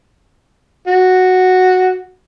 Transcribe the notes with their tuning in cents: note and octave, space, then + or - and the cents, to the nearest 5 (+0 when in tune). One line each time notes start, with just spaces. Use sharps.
F#4 -5